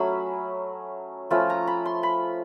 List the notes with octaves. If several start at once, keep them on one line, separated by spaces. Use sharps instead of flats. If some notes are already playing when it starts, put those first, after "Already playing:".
Already playing: F#3 A3 C#4 B5
F3 A3 C#4 F4 B5
A#5
B5
C6
B5